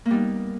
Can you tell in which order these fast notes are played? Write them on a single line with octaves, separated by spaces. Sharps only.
A#3 B3 G3 D#4